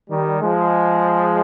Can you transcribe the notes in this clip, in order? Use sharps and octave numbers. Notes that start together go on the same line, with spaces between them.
D#3 G3
F3 G#3